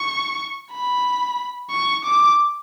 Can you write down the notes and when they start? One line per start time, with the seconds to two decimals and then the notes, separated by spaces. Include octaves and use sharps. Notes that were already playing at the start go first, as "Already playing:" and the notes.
Already playing: C#6
0.72 B5
1.71 C#6
2.05 D6